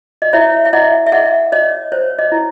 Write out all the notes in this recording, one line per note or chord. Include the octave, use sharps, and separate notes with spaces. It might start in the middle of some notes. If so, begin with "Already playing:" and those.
D#5
E4 C#5 E5
E5
E4 D#5 F#5
E5
G#4 D#5 F#5
C#5 D#5
C5 C#5
D#5
E4